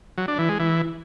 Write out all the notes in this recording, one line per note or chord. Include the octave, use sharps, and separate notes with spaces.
F#3
D4
E3
G#3
E3